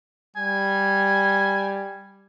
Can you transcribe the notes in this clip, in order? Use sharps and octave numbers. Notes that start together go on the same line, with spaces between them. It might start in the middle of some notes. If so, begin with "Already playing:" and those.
G3 G#5